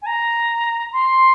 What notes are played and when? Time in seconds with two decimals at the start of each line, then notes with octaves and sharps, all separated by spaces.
0.02 G#5
0.06 A#5
0.92 C6